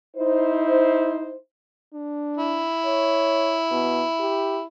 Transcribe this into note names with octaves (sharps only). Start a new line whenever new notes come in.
D#4 E4 C5
D4
E4
C#5
B2
G4